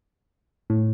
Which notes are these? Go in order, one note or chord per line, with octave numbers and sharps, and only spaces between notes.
A2